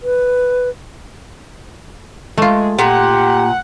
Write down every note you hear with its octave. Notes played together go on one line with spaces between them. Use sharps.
B4
G#3 A3 F4
A#2 G4 F#5